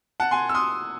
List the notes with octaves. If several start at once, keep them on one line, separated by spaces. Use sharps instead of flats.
F#5 A5
G#5 C6
E6
C6 D#6